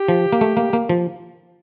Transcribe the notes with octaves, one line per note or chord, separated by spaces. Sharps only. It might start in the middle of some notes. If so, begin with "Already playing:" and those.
Already playing: G4
F3
A#3
A3
A#3
A#3
F3